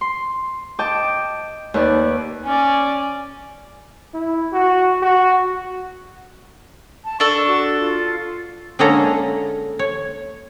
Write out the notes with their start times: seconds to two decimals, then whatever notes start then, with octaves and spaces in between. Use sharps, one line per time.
0.01 C6
0.79 D#5 G5 A5 D6
1.74 D#2 B4 D5
2.44 C#4 D5 G#5
4.14 E4
4.53 F#4
5.03 F#4
7.04 A5
7.20 D4 A4 C#6
7.48 F#4
7.80 F4
8.79 D3 G#3 A#3 C#4 A4 A#5
9.79 C#5